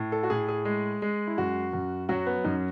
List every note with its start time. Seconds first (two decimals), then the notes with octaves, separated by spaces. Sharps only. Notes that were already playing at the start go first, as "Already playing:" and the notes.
Already playing: A2
0.12 A4
0.23 F#4
0.30 A2 G#4
0.48 G#4
0.65 G#3
1.02 G#3
1.27 E4
1.38 F#2 F#4
1.73 F#2
2.09 F#3 F#4
2.26 B3
2.44 F#2 D#4